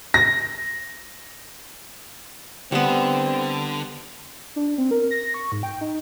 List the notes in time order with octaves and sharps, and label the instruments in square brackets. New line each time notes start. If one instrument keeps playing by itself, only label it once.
[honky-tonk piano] A#6
[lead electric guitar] D3 [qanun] G3 B3 [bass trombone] C4 [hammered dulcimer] F#5
[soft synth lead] D4
C4
A#4
A#6
C#6
G#2
G5
D#4